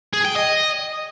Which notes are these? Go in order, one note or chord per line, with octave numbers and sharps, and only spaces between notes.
G#4
G5
D#5